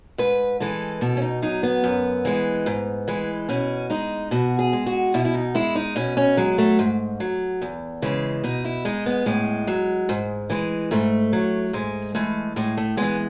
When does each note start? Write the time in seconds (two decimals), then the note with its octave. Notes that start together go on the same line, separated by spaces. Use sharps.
0.18 G#2 B4
0.60 E3 G#3 A4
1.01 B2 A4
1.17 C#4
1.22 D#4
1.42 F#3 D#4
1.63 B3
1.84 F#2
2.25 E3 G#3
2.66 G#2
3.08 E3 G#3
3.49 B2 C#4
3.90 G#3 D#4
4.31 B2 F#4
4.59 G#4
4.73 G#3
4.86 F#4
5.14 B2 E4
5.25 E4
5.34 D#4
5.55 G#3 E4
5.75 D#4
5.96 B2 C#4
6.17 C#4
6.37 F#3 G#3
6.58 A3
6.79 G#2
7.20 F#3
7.62 E2
8.02 C#3 E3 G#3
8.44 B2 D#4
8.65 E4
8.85 G#3 D#4
9.06 B3
9.26 A2 G#3
9.67 F#3
10.09 G#2
10.50 E3 G#3
10.91 G#2 A3
11.33 F#3
11.73 G#2 G#3
12.15 E3 G#3 A3
12.56 A2 G#3
12.77 A3
12.97 E3 G#3 B3